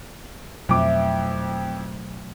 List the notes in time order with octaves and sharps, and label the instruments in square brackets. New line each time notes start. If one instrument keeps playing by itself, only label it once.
[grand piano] F2 D6 [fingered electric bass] B2 F#3 A3 [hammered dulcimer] E3 C4